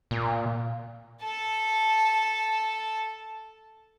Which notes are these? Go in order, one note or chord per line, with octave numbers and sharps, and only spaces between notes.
A#2
A4 A5